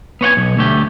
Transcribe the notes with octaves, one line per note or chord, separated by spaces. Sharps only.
B3 C#5 F#5 G#5
B1
D2 A3 G4